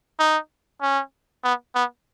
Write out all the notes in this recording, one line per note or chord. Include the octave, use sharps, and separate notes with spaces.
D#4
C#4
B3
B3